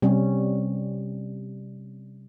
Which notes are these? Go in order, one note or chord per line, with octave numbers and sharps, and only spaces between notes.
C3 G3 C#4